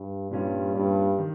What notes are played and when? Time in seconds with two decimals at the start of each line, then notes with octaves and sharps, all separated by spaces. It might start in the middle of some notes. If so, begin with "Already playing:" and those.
Already playing: G2
0.31 G2 A#2 G3 C#4 F4
0.75 G2
1.19 D#3